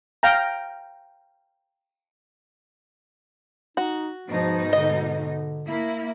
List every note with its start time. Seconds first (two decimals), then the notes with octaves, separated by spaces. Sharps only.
0.23 F5 G5 A#5
3.77 D#4 F#4
4.28 G#2 B2 F3 D#4
4.73 D3 D#5
5.65 A#3 E4